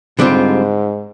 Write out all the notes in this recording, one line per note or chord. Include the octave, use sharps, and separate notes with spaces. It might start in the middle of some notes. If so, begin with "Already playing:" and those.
G#2 D3 G3 C4 F4